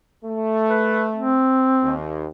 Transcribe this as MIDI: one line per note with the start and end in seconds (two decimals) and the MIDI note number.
0.25 1.42 57
0.70 1.04 71
1.16 1.92 60
1.84 2.27 39